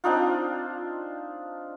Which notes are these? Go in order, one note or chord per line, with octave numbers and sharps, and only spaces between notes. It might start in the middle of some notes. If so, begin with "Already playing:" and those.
C4 D4 D#4 F4